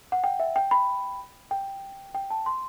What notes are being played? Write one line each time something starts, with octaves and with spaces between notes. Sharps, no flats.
F#5
G5
E5
G5
B5
G5
G5
A5
C6